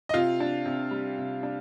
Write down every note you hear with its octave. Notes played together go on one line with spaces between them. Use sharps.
D#5
C3 F4 F5
D4
C3
G3
C3
D4